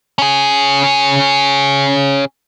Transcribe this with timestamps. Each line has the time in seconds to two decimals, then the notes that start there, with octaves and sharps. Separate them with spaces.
0.18 C#4 G#4